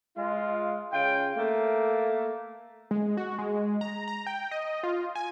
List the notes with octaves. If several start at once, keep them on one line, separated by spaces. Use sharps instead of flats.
G#3 F4
C#3 F4 G5
A3 A#3
G#3
F#4
G#3
A#5
A#5
G5
D#5
F4
G#5